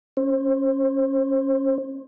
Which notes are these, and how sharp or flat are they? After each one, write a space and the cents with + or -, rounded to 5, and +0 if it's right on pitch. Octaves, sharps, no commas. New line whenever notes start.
C#4 -15 C5 +30